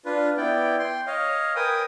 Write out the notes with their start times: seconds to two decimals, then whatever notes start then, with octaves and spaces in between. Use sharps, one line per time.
0.05 D4 F4 B4
0.37 B3 E4 D5 G5
0.79 G5 C6
1.07 C#5 D#5 F5
1.56 A#4 B4 G5 G#5 D#6